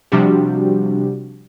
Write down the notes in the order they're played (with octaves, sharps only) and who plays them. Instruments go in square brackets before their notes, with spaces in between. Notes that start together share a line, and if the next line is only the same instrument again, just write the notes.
[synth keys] C3 F3 G3 D4 F#4 G4